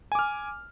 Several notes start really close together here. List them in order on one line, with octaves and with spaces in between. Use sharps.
G#5 D6 F6